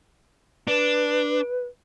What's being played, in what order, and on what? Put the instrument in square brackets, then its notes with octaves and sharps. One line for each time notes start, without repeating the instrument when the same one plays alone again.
[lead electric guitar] D4 [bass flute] B4